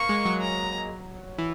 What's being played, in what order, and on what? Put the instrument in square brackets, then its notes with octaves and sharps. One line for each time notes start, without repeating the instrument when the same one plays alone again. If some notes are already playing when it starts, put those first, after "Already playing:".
Already playing: [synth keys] A#3 [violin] C#6
[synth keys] G#3
F#3
[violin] A#5
[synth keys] E3